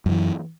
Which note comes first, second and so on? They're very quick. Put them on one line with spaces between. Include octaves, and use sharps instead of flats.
F#2 F3 E3